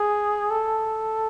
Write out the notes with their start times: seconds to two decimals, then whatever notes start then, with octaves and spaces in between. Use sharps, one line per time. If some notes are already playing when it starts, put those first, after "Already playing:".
Already playing: G#4
0.51 A4